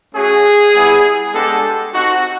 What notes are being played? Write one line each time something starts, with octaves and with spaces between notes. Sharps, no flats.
A3 C#4 F#4 G#4
G3 B3 E4
G#3 B3 D4 G4 A4
C4 D#4 F#4